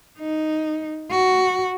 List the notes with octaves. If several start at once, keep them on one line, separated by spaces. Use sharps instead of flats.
D#4
F#4